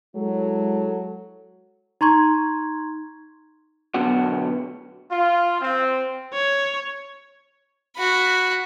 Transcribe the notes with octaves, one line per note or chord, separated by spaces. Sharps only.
F#3 G#3 E4 A4
D#4 A#5 C6 C#6 G#6
B2 D3 F#3 B3 F#4
F4
C4
C#5
F#4 B5